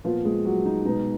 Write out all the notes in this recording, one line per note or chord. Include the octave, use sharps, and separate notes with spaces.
A#2 F3 B3 F4
G#3 G#4
F#3 F#4
D#4
B2 G#3 B3 D#4